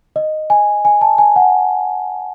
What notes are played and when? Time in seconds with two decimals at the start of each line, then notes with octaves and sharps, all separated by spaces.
0.16 D#5
0.50 G#5
0.85 G#5
1.01 A5
1.18 G#5
1.36 F#5